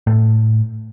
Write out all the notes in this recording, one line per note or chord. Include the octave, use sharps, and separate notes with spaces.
A2